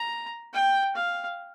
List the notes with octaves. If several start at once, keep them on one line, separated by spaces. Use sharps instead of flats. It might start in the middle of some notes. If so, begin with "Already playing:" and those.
Already playing: A#5
G5
F5